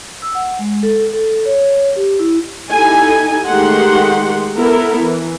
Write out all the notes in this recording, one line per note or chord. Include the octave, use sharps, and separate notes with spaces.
E6
F#5
G#3
A4
A4
C#5
G4
E4
D#4 E4 G4 A4 G#5
D#3 G#3 A3 G4 F#5 C6
B3 E4 A4 A#4
E3